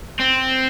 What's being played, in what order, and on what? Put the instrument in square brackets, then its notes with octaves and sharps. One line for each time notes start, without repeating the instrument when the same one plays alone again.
[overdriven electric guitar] C4